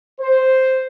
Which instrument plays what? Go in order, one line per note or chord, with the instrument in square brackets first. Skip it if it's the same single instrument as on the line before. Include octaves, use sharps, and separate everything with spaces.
[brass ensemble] C5